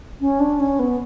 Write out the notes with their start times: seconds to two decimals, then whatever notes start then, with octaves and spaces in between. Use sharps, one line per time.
0.21 C#4
0.40 D4
0.60 C#4
0.79 B3